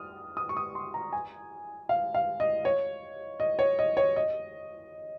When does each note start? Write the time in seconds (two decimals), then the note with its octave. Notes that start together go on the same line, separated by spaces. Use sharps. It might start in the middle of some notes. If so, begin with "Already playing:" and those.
Already playing: D#6 F6
0.37 D#6
0.49 C#6
0.57 D#6
0.75 C6
0.94 A#5
1.13 G#5
1.89 F5
2.14 F5
2.40 D#5
2.65 C#5
3.40 D#5
3.59 C#5
3.79 D#5
3.97 C#5
4.16 D#5